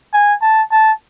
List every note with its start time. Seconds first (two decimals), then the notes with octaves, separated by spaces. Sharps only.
0.14 G#5
0.42 A5
0.72 A5